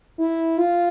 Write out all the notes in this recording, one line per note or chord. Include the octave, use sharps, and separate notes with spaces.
E4
F4